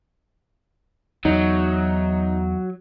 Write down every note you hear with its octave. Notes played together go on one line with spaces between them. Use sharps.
E2 F#3 D#4